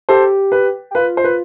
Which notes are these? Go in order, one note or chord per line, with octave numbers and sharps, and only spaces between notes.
G4 A4 C5
B4
G4
F4 B4
C5
B4